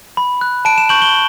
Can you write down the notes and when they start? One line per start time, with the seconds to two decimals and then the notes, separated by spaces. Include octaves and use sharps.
0.17 B5
0.41 F#6
0.65 A5 D7
0.78 E7
0.89 C#6 G6 F#7
1.02 G7